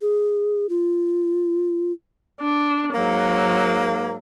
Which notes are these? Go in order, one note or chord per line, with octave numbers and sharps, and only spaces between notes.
G#4
F4
D4
G#2 F#3 A#3